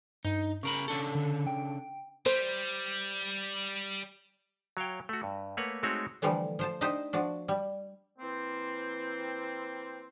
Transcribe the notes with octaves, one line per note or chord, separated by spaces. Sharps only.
G2 D#4
C#3 A#4 B5 C#6
C#3 D4 A4
D3
G5
G3 C5
F#3 C#5 F5 G5
A3 F#4
G2
A3 A#3 B4 C#5 F#5
G#3 A3 C4 D#4 F#4 C#5
D3 E3 F3 G3 A3
F3 C5 A5
D4 D#4 G4 C5 D#5 G5
F3 D4 F#4
G3
E3 A#3 C4